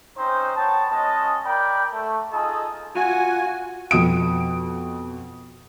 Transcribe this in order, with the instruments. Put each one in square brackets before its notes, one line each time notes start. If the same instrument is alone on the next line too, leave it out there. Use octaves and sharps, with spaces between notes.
[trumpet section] C4 C#4 D#4 C5
B3 C#5 G5 A5
G#3 C#4 D#5 A5
A#4 D5 G5 B5
A3
D#4 F4 G#4 A4 D#5
[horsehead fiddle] F4 F#4 [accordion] G#5
[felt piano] F2 B2 D#6 D7